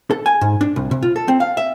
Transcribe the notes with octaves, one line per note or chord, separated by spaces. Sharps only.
A4
G#5
G#2
D4
C2
C3
F4
A4
C4
F5
E5